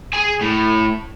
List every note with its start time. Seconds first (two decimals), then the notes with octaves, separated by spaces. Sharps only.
0.13 G#4 G#5
0.41 A2